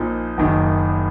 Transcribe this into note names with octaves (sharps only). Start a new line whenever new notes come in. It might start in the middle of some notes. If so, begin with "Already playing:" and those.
Already playing: A#1 A#2 F3 A#3 D#4
F#1 F#2 D#3